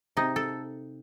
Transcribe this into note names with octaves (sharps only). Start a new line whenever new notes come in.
C3 D#4
A4